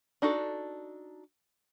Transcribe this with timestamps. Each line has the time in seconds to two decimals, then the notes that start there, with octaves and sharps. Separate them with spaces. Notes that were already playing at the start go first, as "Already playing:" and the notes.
0.22 D4 D#4 F#4 A4